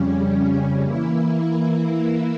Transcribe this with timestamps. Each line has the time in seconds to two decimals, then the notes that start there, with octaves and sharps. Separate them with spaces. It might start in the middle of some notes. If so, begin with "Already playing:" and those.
Already playing: F2 C#3 G3 C#4
0.82 E3 A#3 E4